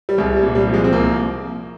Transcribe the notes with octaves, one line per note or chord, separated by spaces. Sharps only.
G3
C2 G#3
G3
A#2
G3
F3
G#3
C4
C2 A#3